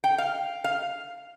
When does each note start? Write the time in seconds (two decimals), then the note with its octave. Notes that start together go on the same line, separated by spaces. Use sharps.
0.04 G5
0.18 F5
0.64 F5